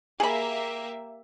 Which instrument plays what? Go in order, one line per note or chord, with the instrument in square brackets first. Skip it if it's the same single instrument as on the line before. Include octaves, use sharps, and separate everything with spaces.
[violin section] A#3 G4 E5 [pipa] G#4 B5